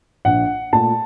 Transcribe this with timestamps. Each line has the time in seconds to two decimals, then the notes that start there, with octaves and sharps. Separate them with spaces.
0.25 A#1 F#5
0.73 A#2 A3 A5